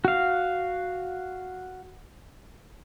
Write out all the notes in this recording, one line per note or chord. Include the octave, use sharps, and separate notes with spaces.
F#4 F5